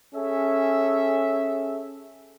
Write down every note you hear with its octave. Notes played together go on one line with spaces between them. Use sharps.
C#4 G#4 A4 E5